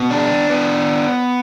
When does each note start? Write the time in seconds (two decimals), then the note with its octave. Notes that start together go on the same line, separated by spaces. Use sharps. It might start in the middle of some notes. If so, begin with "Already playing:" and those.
Already playing: B2 B3
0.10 D4
0.50 B3